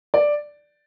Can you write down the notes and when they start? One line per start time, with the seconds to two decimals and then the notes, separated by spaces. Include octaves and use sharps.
0.14 D5